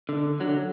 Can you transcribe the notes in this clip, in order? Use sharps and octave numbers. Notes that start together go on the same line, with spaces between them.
D3
D3 F#3